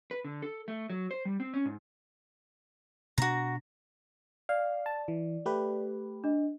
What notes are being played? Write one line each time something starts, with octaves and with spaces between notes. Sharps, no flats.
B4
D3
A4
A3
F#3
C5
G3
C4
C#4
G#2
B2 C4 D4 F#4 A#5
D5 F5
A5
E3
A3 G4 B4
D4 D#5